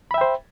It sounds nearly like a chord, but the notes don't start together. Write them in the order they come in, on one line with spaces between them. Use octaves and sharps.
B5 E5 G5 C5